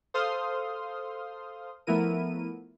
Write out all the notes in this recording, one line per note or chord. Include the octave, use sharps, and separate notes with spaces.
A4 C5 F5 C6 D#6 F6
F3 A3 B3 E4 A#4 D#7